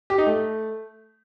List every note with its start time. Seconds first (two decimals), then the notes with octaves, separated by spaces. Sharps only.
0.10 G4
0.18 D#4
0.27 A3